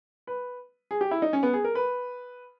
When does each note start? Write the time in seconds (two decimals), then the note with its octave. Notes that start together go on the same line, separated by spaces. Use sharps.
0.27 B4
0.91 G#4
1.01 G4
1.11 E4
1.22 D#4
1.33 C#4
1.43 B3
1.53 G#4
1.64 A#4
1.75 B4